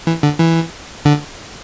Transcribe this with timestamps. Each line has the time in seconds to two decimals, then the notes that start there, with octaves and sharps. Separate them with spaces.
0.07 E3
0.23 D3
0.40 E3
1.05 D3